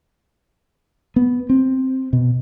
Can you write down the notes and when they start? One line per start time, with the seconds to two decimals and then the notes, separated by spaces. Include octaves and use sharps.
1.16 B3
1.49 C4
2.13 B2